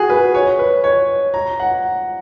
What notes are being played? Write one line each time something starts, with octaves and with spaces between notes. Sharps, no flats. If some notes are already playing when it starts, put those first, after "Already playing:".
Already playing: F#4 G#4
B4
C#5
B4
C#5
A#5
F#5